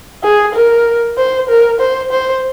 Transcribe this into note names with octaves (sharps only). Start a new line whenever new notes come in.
G#4
A#4
C5
A#4
C5
C5